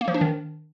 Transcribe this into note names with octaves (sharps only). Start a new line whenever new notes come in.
A#3
F3
D4
D#3